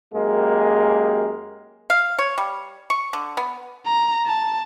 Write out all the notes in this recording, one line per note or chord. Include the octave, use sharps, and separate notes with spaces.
F#2 G#3 A#3 G4 A#4
F5
C#5
G3
C#6
D3
B3
A#5
A5